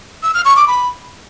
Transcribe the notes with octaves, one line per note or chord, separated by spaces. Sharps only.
E6
F6
C#6
D6
B5